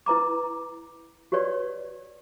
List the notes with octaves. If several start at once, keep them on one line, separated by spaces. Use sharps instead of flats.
E4 B4 A#5 D6
F#4 G4 B4 C#5 D5